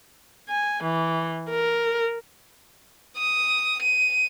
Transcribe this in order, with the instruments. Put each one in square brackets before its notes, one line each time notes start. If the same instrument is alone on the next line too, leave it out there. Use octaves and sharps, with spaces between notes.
[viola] G#5
E3
A#4
[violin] D#6
D#7